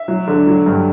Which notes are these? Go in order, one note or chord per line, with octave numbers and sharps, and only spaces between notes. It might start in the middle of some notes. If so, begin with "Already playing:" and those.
Already playing: E5
F#3
D3
F#3
G2